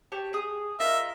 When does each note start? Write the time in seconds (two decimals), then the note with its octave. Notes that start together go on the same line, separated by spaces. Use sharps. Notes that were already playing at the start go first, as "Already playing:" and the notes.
0.12 G4 C#5 A5
0.33 G#4 D#6
0.80 D#4 F4 A#4 E5